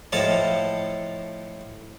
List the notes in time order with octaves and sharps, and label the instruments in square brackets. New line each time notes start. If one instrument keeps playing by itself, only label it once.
[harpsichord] A2 F3 A4 D#5 F5 A5